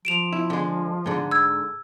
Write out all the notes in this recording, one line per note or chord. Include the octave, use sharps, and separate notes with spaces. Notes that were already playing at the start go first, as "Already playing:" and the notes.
F3 D7 E7 F7
E4
D3 G#3
G#2 D3
E6 G#6